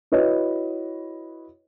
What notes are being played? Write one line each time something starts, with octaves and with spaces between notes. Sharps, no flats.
E4 F#4 B4 C#5 D#5